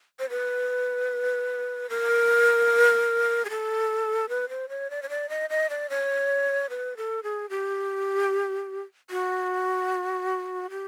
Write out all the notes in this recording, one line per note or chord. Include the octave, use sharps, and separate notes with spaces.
C5
B4
A#4
G#4
A4
B4
C5
C#5
D5
C#5
D5
D#5
D#5
D5
C#5
B4
A4
G#4
G4
F#4
G4